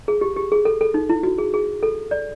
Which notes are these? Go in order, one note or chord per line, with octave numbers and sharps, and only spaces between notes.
G#4
G4
G4
G#4
A4
A4
D#4
E4
F#4
G#4
G#4
A4
D5